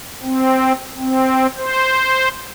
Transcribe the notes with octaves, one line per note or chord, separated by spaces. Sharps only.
C4
C4
C5